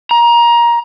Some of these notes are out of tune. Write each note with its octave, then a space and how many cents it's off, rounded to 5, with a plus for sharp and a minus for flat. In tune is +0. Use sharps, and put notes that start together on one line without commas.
A#5 +20